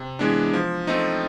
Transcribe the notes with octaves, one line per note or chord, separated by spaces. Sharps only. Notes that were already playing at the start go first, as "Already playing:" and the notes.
Already playing: C3
E3 G#3 B3 D4
F3
A3 C4 D#4